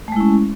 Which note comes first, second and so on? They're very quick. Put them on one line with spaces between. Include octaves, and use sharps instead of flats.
A3 G#3 E4 C#4